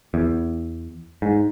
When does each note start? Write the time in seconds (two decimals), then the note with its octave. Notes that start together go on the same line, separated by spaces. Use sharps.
0.14 E2
1.22 G#2